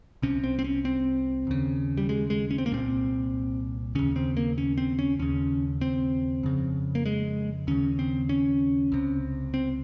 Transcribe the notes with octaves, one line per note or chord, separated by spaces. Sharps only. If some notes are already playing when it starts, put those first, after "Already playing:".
C2 C3 C#4
C4
C4
C#4
C4
D#2 C#3
G3
G#3
G#3
C#4
C4
A#3
C2 A#2 C4
D#2 C#3 C#4
C4
A#3
C#4
C4
C#4
D#2 C#3 C#4
C4
F2 C#3
A#3
G#3
D#2 C#3 C#4
C4
C#4
C#2 C3
C4